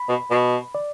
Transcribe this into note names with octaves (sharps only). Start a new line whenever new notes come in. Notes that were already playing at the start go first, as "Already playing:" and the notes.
Already playing: B5
B2
B2
D5